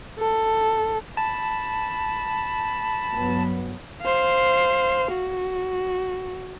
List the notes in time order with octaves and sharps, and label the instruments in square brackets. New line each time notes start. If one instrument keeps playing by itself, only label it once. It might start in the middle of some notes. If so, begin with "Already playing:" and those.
[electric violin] A4
[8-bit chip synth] A5 [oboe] B5
[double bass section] G2 F#3 B3
[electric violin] C5 F5
F#4